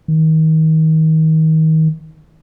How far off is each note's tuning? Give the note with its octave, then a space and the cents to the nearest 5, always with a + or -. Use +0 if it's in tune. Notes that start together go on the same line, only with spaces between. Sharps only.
D#3 +30